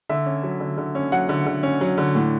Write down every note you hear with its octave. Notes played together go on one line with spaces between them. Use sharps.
D3 E5
C#4
F#3
D3
D3
C#4
F#3 F#5
D3
D3
C#4
F#3
D3
A2